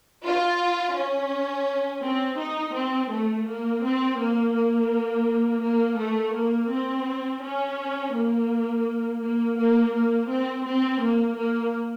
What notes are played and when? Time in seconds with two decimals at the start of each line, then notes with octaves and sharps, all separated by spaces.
0.24 F4
0.96 C#4
2.03 C4
2.39 D#4
2.75 C4
3.11 A3
3.48 A#3
3.83 C4
4.19 A#3
4.55 A#3
5.63 A#3
5.99 A3
6.35 A#3
6.70 C4
7.43 C#4
8.14 A#3
9.22 A#3
9.58 A#3
9.94 A#3
10.30 C4
10.65 C4
11.02 A#3
11.38 A#3